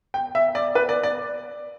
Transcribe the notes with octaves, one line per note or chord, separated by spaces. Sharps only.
G5
E5
D5
B4
D5
D5